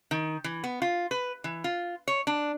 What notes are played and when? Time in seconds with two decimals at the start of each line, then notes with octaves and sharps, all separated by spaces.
0.11 D#3
0.44 E3
0.64 B3
0.82 F4
1.11 B4
1.44 E3
1.64 F4
2.08 C#5
2.27 D4